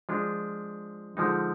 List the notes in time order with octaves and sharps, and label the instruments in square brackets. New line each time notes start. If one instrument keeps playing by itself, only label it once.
[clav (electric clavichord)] F3 G#3 D4 F4
D3 F3 G#3 D#4